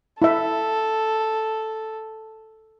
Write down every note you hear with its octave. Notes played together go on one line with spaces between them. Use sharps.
E4 A4 E5